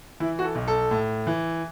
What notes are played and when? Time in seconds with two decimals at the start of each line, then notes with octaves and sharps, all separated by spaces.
0.20 E3 E4
0.39 F#4
0.44 A4
0.55 B1
0.68 A4
0.91 A2
1.27 E3